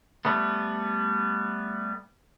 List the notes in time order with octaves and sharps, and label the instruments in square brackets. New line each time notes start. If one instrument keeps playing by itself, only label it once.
[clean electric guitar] G3 A3 B3